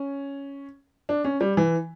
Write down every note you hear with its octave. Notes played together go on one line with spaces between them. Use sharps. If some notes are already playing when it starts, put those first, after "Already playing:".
Already playing: C#4
D4
C#4
G3
E3